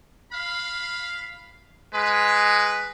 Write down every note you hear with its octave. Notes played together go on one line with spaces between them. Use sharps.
F5 B5
G#3 B4